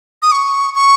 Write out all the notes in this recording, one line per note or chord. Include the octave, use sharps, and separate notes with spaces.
D#6
C#6
C#6